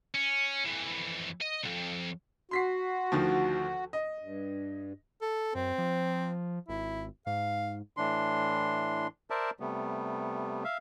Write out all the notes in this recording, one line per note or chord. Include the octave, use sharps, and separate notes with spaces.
C#4
F2 E3
D#5
C2 F2
F#4 C6 B6 C7
D2 D#3 F3
D#5
G2
A4
F#2 C4
F3
G#1 E4
G#2 F5
A2 E3 D4 C6
A#4 C5 D5 E5 A5
C3 G3 A3 B3
E5 F5